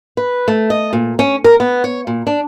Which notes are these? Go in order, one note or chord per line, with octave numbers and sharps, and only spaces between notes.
B4
A3
D#5
A#2
C#4
A#4
B3
C#5
A#2
D4